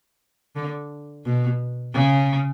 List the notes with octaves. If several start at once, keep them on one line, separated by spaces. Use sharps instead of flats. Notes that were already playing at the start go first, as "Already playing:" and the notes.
D3
B2
C#3